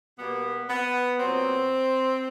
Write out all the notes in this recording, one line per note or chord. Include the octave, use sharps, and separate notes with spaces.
B2 G3 A#3 B3
B3
A#2 F#3 B3 C4